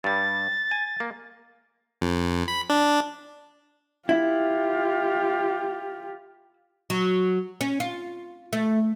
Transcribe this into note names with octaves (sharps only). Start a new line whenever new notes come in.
G2 G3 A6
G#5
A#3
F2
B5
D4
E4 F4 G4
F#3
C#4
F4
A3